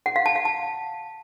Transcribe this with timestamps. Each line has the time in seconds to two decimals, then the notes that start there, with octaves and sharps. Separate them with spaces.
0.06 F#5
0.16 F5
0.26 A5
0.35 F5
0.45 A5